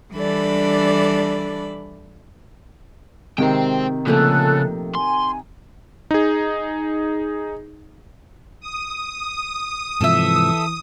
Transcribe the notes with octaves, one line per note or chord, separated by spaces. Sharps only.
E3 G3 D4 A4 D5 B5
C3 D#3 G#3 C5 G5
A#2 C#3 F3 A3 A4 F#6
G#5 C6
D#4 G#4
D#6
G#2 C3 E3 F3 A4 E5